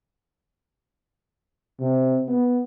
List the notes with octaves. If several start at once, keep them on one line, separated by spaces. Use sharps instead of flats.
C3
B3